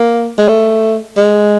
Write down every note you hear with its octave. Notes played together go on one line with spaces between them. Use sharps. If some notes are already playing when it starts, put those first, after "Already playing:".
Already playing: A#3
G#3
A3
G#3